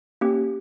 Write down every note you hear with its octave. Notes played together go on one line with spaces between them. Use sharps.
A#3 C#4 G4